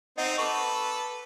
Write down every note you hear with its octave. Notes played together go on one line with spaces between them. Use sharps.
C4 D#4 D#5 F#5
A4 B4 C#6 D6